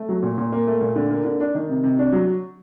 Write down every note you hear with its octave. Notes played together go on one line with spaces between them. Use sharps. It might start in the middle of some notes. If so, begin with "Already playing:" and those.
Already playing: A3
F#3
A#2
A#2
A#3
A3
A#2
D3
A#3
D3
D4
D#3
C3
C3
D4
F#3